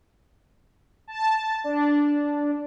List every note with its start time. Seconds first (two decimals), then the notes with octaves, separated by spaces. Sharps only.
1.08 A5
1.64 D4